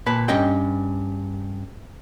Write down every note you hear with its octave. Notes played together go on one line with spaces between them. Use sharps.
A#2 B4 A5
G2 C#4 D#5 G5